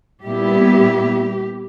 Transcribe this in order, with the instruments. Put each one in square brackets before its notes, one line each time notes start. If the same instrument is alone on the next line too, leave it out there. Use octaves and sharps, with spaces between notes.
[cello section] A#2 G3 B3 E4 G4